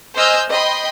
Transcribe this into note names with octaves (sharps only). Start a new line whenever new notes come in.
C5 D#5 G#5 E6 F6 G6
D#5 G5 B5 C6